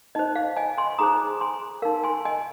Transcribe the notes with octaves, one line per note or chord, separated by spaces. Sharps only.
D#4 C5 D#5
F5
D#5 G#5
G#5 C6
D#4 G#4 C5 A#5 D#6
G#5 C6
D#4 A#4 F5
G#5 C6
D#5 G#5